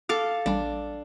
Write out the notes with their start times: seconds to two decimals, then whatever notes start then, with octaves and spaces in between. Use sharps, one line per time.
0.09 A4 F5 D6 F6 A6
0.46 A1 G3 D4